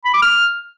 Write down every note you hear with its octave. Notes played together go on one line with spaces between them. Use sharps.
B5
D6
F6